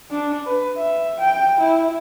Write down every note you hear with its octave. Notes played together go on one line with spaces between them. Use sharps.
D4
B4
E5
G5
E4